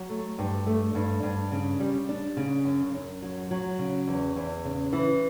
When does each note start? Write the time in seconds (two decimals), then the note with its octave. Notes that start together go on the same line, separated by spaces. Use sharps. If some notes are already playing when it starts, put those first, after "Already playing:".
Already playing: F#3
0.09 A3
0.39 G2
0.67 A3
0.95 G2
1.23 G2
1.51 C#3
1.80 G3
2.09 D4
2.37 C#3
2.65 F#2
2.94 F#2
3.22 F#3
3.51 F#3
3.79 C#3
4.07 E2
4.36 E2
4.65 C#3
4.93 E3